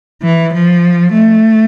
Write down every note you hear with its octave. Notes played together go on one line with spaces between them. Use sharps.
E3
F3
A3